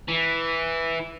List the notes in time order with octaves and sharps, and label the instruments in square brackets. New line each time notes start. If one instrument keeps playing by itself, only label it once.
[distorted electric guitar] E3